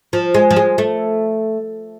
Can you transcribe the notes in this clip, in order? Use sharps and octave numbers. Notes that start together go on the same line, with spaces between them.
F3
G#3
F3
G#3
A3